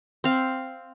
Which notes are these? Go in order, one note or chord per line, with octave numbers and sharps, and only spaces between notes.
C4 F5